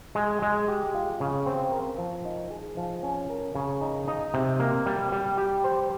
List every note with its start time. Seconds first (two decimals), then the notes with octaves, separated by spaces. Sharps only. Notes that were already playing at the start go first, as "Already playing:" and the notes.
0.15 G#3
0.42 G#3
0.68 G4
0.95 F4
1.20 C#3
1.46 C4
1.72 A#4
1.98 F3
2.25 D#4
2.51 G#4
2.77 F3
3.03 C#4
3.30 A#4
3.55 C#3
3.81 D#4
4.08 D#4
4.34 C3
4.60 A#3
4.86 G3
5.12 G3
5.38 G4
5.64 C5